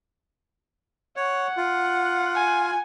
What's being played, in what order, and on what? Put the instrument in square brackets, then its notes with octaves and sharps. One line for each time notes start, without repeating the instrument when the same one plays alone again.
[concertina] C#5 [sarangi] F#5
[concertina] F4
[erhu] G#5